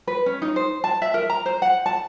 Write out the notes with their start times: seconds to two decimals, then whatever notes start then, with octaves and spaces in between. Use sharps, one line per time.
0.07 B4
0.26 C#4
0.42 D#4
0.56 C5
0.84 A5
1.02 E5
1.14 A#4
1.30 A#5
1.46 C5
1.62 F#5
1.86 A5